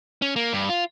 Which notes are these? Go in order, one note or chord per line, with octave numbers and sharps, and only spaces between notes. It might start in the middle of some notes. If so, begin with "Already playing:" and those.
C#4
A#3
G2
F4